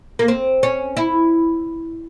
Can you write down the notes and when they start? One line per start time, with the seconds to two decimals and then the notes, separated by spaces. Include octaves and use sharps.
0.19 A#3
0.28 C4
0.63 C#4
0.97 E4